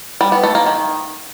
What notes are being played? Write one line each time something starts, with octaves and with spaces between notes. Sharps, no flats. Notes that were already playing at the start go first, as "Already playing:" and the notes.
G3
B3
A3
A#3
D#3